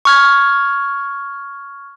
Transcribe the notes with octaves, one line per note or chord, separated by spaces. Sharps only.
C#6 F6 G#6